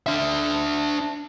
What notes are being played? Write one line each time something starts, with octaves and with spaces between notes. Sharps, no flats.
D4 E5